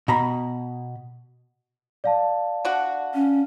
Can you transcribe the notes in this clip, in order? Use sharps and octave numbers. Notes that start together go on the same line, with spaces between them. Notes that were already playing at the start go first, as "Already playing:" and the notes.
B2 A#5 B5
D5 F5 A5
D4 F#4
C#4